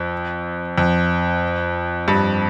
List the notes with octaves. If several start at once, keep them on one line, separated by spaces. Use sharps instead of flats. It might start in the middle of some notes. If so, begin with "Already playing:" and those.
Already playing: F2
F2
G2